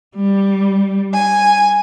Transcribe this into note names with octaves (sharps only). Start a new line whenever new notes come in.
G3
G#5